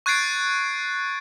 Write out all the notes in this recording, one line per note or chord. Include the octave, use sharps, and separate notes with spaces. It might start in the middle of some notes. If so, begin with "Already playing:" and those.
C#6 F#6 G#6 A6 C7 D7